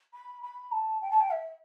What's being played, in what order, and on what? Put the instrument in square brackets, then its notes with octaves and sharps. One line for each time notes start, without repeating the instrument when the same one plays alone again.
[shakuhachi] B5
B5
A5
G5
A5
G5
E5